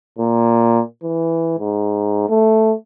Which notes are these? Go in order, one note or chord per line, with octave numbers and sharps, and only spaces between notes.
A#2
E3
G#2
A3